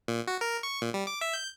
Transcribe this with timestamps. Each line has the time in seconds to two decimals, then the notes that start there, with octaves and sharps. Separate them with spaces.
0.08 A#2
0.27 F#4
0.41 A#4
0.63 C#6
0.82 A#2
0.94 G3
1.07 D6
1.21 E5
1.34 G6